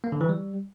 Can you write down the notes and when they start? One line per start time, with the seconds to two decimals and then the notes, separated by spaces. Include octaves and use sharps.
0.04 A#3
0.12 D3
0.21 E3
0.29 G3